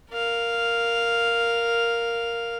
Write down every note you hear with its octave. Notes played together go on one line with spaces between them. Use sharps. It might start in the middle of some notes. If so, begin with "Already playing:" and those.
A#4 F5